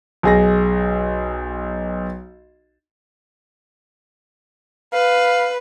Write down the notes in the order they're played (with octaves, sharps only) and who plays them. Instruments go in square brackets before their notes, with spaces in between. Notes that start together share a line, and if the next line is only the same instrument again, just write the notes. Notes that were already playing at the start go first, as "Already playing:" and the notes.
[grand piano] B1 G#4 A#6
[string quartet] B4 [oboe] F5